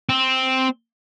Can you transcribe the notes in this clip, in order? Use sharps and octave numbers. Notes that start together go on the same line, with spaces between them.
C4